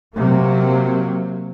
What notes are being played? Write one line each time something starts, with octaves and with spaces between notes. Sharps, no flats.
C3 F#3 A#3